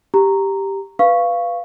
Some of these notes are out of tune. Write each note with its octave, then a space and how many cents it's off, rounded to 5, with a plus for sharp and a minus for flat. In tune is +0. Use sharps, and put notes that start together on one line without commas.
G4 +0 A#5 -5
B4 +0 F5 -15 C#6 -5